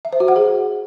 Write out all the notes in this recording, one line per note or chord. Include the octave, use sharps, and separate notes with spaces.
E5
C5
F#4
F#5
G#4